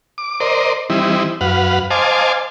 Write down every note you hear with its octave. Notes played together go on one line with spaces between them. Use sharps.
D6
A#4 C5 D5 D#5
E3 G3 C4 D#4 E4
F#2 B4 F5 F#5
C5 D#5 F5 G#5 A5 D6